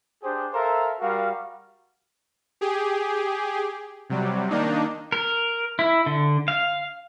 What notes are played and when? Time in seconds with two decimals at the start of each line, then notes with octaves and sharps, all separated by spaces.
0.23 D4 G4 G#4 C5
0.54 A4 A#4 C5 E5 F5 A#5
1.01 G3 F#4 A#4 F5
2.61 G4 G#4
4.10 C3 F#3 G3
4.51 D#3 A#3 D4 D#4
5.12 A#4
5.79 E4
6.06 D3
6.48 F5